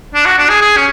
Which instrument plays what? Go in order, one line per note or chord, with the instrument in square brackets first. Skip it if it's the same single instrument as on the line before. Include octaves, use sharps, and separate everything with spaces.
[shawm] D4
F#4
D4
G#4
G#4
C#4